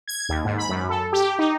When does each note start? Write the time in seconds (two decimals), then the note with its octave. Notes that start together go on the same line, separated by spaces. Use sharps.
0.08 G#6
0.29 D#2
0.45 G#2
0.58 B5
0.69 F#2
0.89 A4
1.13 G4
1.39 D#4